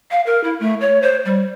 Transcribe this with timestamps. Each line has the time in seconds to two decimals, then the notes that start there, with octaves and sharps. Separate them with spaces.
0.11 F5
0.26 A#4
0.44 E4
0.60 A3
0.81 C#5
1.02 C5
1.25 G3